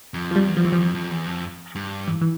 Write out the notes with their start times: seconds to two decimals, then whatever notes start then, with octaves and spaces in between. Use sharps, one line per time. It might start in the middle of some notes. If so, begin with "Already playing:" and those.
0.14 F2
0.31 F3
0.36 G3
0.47 E2
0.57 F3
0.65 E3
0.72 F3
0.79 F2
0.95 F2
1.11 E2
1.26 F2
1.75 G2
2.08 E3
2.21 E3